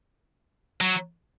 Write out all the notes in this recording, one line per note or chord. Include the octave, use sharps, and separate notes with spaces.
F#3